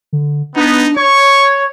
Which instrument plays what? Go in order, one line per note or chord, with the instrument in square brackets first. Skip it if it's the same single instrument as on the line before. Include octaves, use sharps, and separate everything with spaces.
[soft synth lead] D3
[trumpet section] B3 [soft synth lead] D4 [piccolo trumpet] D#4
[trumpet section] C#5 [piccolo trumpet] C#6 [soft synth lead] G#6